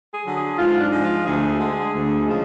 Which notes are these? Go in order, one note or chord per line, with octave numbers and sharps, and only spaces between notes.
G#4
D3 F#3
G#4
G#2 F4
D4
F3 G#3
F4
D2 G#4
D3 G#3
D2
C#3 F3 G#3